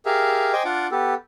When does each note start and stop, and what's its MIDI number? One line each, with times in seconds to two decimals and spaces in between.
0.06 0.52 67
0.06 0.52 68
0.06 0.52 70
0.06 0.52 76
0.06 0.52 77
0.53 0.63 72
0.53 0.63 75
0.53 0.63 79
0.53 0.63 80
0.53 0.63 86
0.65 0.87 62
0.65 0.87 65
0.65 0.87 78
0.65 0.87 86
0.91 1.14 59
0.91 1.14 67
0.91 1.14 69